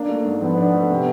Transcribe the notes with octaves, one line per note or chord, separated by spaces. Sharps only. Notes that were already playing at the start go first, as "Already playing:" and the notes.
Already playing: A#3 D4
A3
G#2
F3 B3
D4
A3
C3